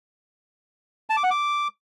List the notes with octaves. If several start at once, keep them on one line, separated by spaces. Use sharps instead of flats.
A5
D6
F#5
D6